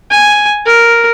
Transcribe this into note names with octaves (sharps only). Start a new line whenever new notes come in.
G#5
A#4